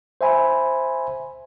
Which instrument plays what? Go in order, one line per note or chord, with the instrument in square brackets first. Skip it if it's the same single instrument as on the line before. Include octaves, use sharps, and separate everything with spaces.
[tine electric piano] C5 E5 G#5 B5